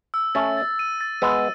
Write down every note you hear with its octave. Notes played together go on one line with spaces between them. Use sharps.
E6
A3 C#4 A6
A6
D#7
A6
G#3 B3 E6